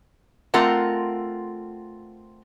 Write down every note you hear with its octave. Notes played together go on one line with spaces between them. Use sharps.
A3 C4 F4 A#4 F#5 A#5